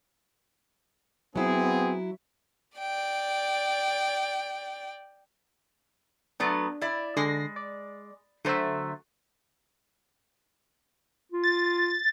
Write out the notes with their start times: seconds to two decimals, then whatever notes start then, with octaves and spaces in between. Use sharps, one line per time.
1.36 F#3 B3 C4 E4 G#4
2.78 D5 G5
6.40 F#3 A3 B3 D4
6.81 E4 D5
7.17 D3 G#3 A#6 C7
7.56 D5
8.45 D3 F#3 A3 C5 E5
11.32 F4
11.44 A6